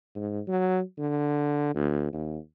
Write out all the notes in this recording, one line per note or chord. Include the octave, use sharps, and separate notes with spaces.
G#2
F#3
D3
D2
D#2